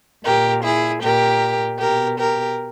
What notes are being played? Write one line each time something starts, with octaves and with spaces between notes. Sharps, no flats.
A#2 G4 A#4
E4 G#4
A#2 G4 A#4
B2 G4 A#4
G4 A#4